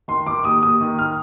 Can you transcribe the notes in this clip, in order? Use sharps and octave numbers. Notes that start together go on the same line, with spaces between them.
D#3 C6
D#3 D6
D#2 D#6
D#2 D#6
D#3
F6